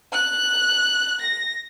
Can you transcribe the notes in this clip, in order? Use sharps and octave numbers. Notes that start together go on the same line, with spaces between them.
F#6
A#6